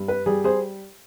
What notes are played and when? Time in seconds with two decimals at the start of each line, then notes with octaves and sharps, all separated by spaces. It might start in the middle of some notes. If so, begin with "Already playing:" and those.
Already playing: G2
0.08 B4
0.26 G3 G#4
0.44 G#4 C5